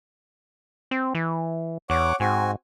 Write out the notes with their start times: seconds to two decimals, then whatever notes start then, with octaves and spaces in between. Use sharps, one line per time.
0.91 C4
1.15 E3
1.90 E2 C#5 F#5 D6
2.20 G#2 C4 F#4 G#5